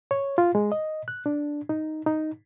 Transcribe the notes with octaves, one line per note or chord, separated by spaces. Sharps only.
C#5
F4
G#3
D#5
F#6
D4
D#4
D#4